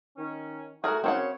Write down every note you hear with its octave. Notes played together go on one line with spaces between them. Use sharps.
D#3 C#4
A3 F#4 G#4 A#4
F#2 C#3 C4 C#5 F#5